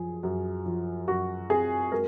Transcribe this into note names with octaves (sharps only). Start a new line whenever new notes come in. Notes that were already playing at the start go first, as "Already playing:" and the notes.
Already playing: F#2 F3 G#4
F#2
F3
F#2 F#4
C4 G#4
G#3 A#4